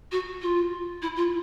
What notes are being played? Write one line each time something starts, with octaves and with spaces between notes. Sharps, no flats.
F#4
F4
E4
F4